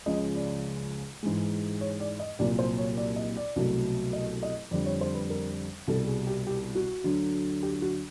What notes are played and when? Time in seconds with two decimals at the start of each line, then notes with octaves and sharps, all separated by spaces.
0.06 C#2 C#3 F3 G#3 D#5
0.35 D5
1.23 G#2 E3 G#3
1.81 C#5
2.00 D5
2.20 D#5
2.39 C2 A#2 F#3 D5
2.59 C5
2.78 C#5
2.97 D5
3.16 D#5
3.37 D5
3.56 C2 B2 F#3 A3
4.13 D#5
4.43 D#5
4.71 F2 D3 G3 D5
4.86 C#5
5.01 C5
5.15 B4
5.30 A#4
5.87 C2 B2 G3 A4
6.07 G#4
6.27 G4
6.47 G4
6.75 F#4
7.04 D2 D3 F#3
7.63 G4
7.82 F#4